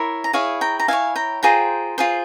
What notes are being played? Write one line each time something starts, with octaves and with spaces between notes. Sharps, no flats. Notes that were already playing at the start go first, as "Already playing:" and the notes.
Already playing: E4 A#4 C#5
A#5
E4 G#4 C#5 F5 G#5
G5 A#5
A#5
E4 G#4 C#5 F5 G#5
G5 A#5
F4 G#4 C5 G5 A#5
F4 G#4 C5